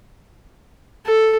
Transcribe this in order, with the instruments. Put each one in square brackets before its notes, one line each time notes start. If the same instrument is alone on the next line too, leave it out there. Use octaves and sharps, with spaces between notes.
[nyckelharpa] A4